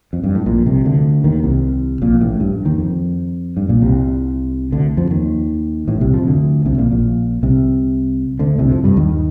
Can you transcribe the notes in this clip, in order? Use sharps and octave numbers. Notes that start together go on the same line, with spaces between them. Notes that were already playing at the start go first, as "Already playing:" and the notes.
F2
G2
A2
A#1 A#2
C2 C3
D2 D3
D#2 D#3
C2 C3
A#1 A#2
A1 A2
G2
D#2 D#3
F2
G2
A#1 A#2
C2 C3
D2 D3
F2 F3
D#2 D#3
A1 A2
C2 C3
F2 F3
D2 D3
C2 C3
A#1 A#2
A#1 A#2
C2 C3
D2 D3
C2 C3
F2 F3
G2 G3
D#2 D#3